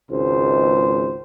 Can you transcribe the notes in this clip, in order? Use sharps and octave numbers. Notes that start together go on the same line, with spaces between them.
G#1 C#2 C5